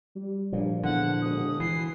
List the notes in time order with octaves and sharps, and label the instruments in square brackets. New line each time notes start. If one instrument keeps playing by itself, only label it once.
[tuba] G3
[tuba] G2 [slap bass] A#2 F3
[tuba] E2 [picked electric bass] D3 [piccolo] F#5
[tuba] E1 [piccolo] D#6
[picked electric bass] E3 [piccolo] C7